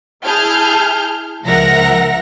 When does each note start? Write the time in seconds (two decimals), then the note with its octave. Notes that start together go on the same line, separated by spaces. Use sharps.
0.25 E4 G#4 A5 F6 G6
1.46 C#2 F3 A#4 E5 F#5 A#6